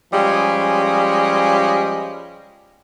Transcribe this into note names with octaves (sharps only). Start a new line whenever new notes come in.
F3 G3 G#3 C#4